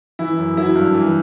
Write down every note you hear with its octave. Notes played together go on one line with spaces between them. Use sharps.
E3 E4
F#2
F#3 E4
G2
E3